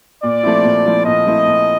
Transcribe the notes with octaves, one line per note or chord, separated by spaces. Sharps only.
A#2 D5
F3 A3 C4 E4
A#2
F3 A3 C4 E4
A#2 D#5
F3 A3 C4 E4
A#2